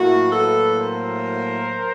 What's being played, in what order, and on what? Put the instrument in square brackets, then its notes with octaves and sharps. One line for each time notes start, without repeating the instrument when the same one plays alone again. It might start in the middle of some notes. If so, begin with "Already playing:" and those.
Already playing: [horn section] A2 F#3 A#3 E4 F#4
A4 B4
A#4 C5